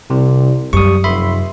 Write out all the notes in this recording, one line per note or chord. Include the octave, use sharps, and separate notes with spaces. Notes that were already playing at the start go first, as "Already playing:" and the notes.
C2 C3
F#2 G3 C#6 D#6
F1 E5 B5 C6